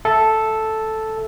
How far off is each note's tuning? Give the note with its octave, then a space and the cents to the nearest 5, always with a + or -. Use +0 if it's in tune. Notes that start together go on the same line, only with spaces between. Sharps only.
A4 +0 E5 +0